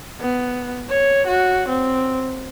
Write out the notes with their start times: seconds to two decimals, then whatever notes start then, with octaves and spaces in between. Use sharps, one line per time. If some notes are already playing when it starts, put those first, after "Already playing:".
0.20 B3
0.89 C#5
1.27 F#4
1.69 C4